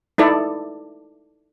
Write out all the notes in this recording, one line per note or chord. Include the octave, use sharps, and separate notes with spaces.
D#4 E4 A4 D5